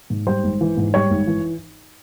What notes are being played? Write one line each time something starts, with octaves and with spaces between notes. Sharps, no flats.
G#2
G3 C5
G#1
E3
G#2
G3 C#5
G#1
E3